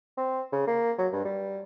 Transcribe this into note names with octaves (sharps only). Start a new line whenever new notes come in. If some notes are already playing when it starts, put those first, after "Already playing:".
C4
C#3
A#3
F#3
G2
G3